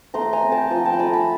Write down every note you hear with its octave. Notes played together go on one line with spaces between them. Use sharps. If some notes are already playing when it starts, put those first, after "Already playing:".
A3 A#5 C6
G#5 A#5
C4
G5 A5
F3 G#5 A#5
G5 A5
B5
A3 G#5 A#5
A5 B5